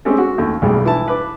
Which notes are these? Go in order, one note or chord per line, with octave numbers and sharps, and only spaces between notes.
G#3 A3 C4 C#4 G4 A4
F#4
D#2 A3
B1 E2 A2 G3 G#3
E3 E4 A5
B4 D6